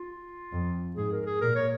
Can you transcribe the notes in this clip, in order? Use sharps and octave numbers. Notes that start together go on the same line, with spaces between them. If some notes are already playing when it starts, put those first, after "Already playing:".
Already playing: F4
F2
G#2 G#4
A#4
G#4
A#2 A#4
C#5